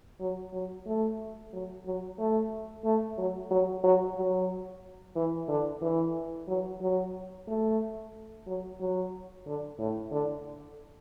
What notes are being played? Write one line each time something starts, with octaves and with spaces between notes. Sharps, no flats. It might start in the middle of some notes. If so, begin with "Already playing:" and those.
F#3
F#3
A3
F#3
F#3
A3
A3
F#3
F#3
F#3
F#3
E3
D3
E3
F#3
F#3
A3
F#3
F#3
D3
A2
D3